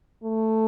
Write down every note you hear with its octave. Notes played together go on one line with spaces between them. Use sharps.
A3